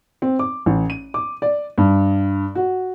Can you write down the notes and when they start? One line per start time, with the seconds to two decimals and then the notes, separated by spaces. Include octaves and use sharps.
0.22 C4
0.39 D6
0.66 A1
0.90 D#7
1.14 D6
1.42 D5
1.78 G2
2.55 F#4